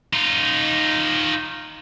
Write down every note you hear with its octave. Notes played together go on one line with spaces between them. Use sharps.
D#4 F4